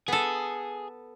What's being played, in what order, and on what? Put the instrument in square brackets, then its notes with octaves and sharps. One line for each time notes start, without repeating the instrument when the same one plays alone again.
[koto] B3 A4 [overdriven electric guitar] G#4